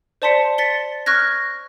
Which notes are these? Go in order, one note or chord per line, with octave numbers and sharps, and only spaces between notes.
C5 D5 A5 C6 B6 C#7
A6 B6 C#7 G7
C#6 F6 F#6 G#6 A#6